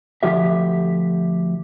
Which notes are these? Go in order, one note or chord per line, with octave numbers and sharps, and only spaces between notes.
D2 F3 G4 E5